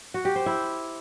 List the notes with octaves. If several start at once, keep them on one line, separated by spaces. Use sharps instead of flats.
F#4
G4
C5
E4